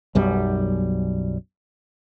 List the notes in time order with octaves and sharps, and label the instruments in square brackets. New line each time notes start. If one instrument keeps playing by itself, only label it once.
[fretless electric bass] B1 F#2 G3